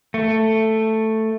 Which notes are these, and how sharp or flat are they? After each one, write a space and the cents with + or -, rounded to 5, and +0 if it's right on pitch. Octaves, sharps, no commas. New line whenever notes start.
A3 +5